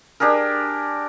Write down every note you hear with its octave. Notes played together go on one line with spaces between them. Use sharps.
D4 G4 G#4 A#4